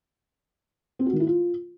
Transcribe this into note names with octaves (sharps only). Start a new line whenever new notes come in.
C4
F#4
D#3
E4
F4